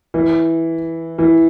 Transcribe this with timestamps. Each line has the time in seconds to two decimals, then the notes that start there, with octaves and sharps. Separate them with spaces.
0.14 E3
1.19 E3